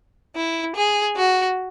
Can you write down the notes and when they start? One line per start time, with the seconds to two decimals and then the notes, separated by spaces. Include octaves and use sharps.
0.36 E4
0.76 G#4
1.16 F#4